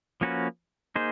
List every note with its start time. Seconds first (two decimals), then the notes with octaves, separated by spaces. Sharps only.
0.21 F3 A#3 C#4 F#4 B4
0.96 A#3 D#4 G#4 C5